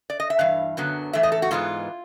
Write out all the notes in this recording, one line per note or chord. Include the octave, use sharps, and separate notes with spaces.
D5
D#5
E5
G2 E3 F5
F#2 D3 F#3 B3
A2 E3 A3 E5
D#5
A4
F#4
G#2 E3 G#3 B3 F4